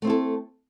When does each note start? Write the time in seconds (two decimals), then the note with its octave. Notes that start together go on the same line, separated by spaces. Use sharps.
0.02 A3
0.05 C4
0.07 E4
0.10 A4